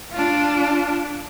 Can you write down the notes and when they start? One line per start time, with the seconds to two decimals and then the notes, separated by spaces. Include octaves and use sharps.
0.12 D4 F4